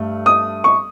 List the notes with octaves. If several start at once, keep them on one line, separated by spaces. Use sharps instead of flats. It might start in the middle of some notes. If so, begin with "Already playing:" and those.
Already playing: G2 A3
D#6
C#6